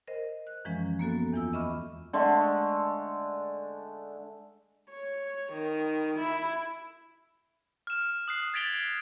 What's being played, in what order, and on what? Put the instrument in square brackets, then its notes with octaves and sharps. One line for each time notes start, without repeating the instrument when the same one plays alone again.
[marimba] A#4 C5 D#5
F#6
F#2 E3 F3 G#3 C#4
A#3 B3 F#4 A4
E2 E3 F4 E6
D#5 E5 B5 C#6 D6 F6
[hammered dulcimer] D3 G#3 A3
[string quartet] C#5
D#3
E4
[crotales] F6 E7
D#6 F#6 C7
G#6 A6 B6 D7 F7 G7